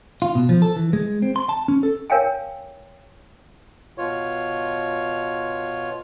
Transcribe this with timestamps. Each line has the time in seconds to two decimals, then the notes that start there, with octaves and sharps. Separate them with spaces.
0.22 F4
0.35 B2
0.49 F3
0.62 A4
0.76 E3
0.93 G#3
1.22 C4
1.36 C6
1.49 A5
1.68 C#4
1.83 A4
2.10 A#4 C#5 F5 G5 G#5
3.98 B2 F4 C#5